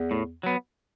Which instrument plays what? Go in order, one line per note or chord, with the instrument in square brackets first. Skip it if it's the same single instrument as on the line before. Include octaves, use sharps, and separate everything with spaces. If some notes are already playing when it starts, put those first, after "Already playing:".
Already playing: [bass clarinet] E2
[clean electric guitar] A2
F#3 B3